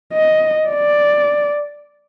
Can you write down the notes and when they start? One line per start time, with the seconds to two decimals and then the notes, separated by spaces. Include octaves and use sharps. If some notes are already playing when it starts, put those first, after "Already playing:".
0.13 D#5
0.69 D5